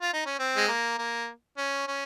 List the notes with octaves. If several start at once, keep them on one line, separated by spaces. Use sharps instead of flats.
F4
D#4
C#4
C4
G#3
A#3
A#3
C#4
C#4